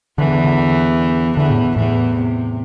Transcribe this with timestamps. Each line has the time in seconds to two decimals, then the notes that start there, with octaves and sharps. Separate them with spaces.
0.18 E2 D3 E3
0.31 D3
0.44 D3
1.37 E2 D3 E3
1.50 A2
1.76 E2 A2 E3
2.16 C3